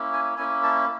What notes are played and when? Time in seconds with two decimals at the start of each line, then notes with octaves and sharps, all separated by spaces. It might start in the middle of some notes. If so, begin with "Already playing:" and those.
Already playing: A#3 C#4 E4
0.13 G#5
0.37 A#3 C#4 E4 G#5
0.63 A5